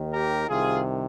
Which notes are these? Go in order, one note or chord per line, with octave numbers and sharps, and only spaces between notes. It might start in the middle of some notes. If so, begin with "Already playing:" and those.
Already playing: D#2 D#3
G4 A#4
C2 C3 D#3 F4 G#4